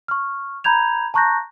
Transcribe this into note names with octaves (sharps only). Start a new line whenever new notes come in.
C#6 F6
A#5 B5 G6 G#6 F7
A5 A#5 C#6 F#6 G6 A#6